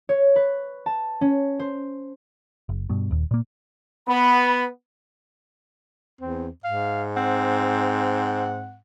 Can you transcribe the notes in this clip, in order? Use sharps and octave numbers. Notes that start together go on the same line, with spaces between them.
C#5
B4
A5
C#4
C5
F#1
G2 B2
D#1 D#2
A#2 A#3
B3 B5
E2 C4
G#2 F5
C4 F#5